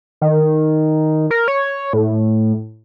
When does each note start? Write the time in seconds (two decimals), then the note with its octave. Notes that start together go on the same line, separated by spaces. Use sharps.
0.21 D#3
1.31 A#4
1.48 C#5
1.93 A2